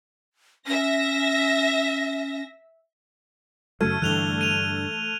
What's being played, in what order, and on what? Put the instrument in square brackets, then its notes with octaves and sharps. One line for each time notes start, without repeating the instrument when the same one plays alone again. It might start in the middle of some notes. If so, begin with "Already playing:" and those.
[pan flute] C#4 [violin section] E5 A#6
[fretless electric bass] F#2 C#3 F#3 [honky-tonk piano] A3 [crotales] F6 G#6 D#7
[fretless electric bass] G2 D3 [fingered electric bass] E3 [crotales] F#6 F7 G7
[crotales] D#7 F7